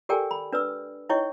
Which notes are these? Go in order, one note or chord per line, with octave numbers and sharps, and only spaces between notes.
G4 A4 A#4 D5 G5 G#5
B5
D4 B4 D5 E6
D#4 E4 C#5 D#5 G5 C#6